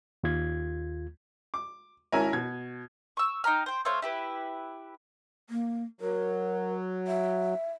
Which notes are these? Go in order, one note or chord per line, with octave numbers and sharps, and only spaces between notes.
D#2 F4 G#6
D6
G#1 C#4 E4 A#4 G#5
B2 G#6
C#6 E6
D#4 G5 A#5 F6
C5 G5
A3 C5 C#5 F5
E4 G4 B4
A#3
F#3 A#4
E5